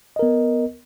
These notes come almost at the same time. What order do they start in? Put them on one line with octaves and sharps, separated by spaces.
D#5 A#4 B3